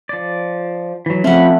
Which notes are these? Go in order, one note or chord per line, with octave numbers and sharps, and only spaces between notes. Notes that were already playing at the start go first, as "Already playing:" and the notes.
F3 D5
E3 F#3
F3 A3 C4 C#4 F4 F#5 B5